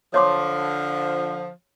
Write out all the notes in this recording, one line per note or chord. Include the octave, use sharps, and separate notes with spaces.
D3 F3 C#5 C6 D6